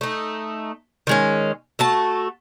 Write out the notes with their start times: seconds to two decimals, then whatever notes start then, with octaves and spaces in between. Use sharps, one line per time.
0.01 A3 D#4
1.07 D#3 G#3 C#4
1.79 A3 F#4 A5